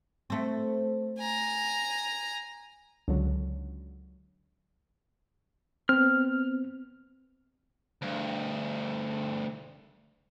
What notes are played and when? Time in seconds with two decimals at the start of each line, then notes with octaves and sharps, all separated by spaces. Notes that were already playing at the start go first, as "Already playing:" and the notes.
0.30 A3 C4
1.18 G#5 A#5
3.08 C#2 D3 F#3
5.89 B3 C4 F6
8.02 D2 G2